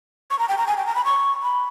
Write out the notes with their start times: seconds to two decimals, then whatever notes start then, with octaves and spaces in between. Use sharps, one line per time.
0.31 C#6
0.39 A#5
0.49 G5
0.58 A#5
0.67 G#5
0.78 G5
0.87 A#5
0.95 B5
1.05 C#6
1.43 B5